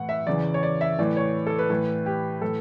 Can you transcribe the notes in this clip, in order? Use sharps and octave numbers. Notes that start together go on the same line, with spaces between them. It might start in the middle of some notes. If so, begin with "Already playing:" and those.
Already playing: A2 E3 F#5
E5
E2 C#3 E3 D5
C#5
D5
E5
A2 E3 D5
C#5
A4
B4
A2 E3
G4
A2 E3 A4